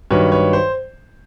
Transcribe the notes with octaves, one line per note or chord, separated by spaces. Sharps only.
G2 D#3 F#3 B4 C#5
B4 C#5
C5